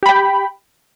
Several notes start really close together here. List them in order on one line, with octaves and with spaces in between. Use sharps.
G4 B5 G5